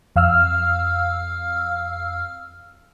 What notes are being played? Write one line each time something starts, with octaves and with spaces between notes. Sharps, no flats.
F2 F5 E6 F6